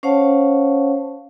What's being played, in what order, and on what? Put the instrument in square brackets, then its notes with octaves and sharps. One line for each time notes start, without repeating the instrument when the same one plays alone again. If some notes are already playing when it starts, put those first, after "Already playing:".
[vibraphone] C#4 C5 C#5 F5 F#5 A5